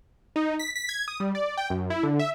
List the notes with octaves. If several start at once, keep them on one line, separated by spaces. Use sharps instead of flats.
D#4
B6
B6
G#6
D#6
G3
D5
G5
F#2
E4
D3
E5